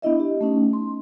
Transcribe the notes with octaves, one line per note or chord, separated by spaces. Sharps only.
B3 D4 E4 D#5 E5
G4
A3 C#4 D#4
C6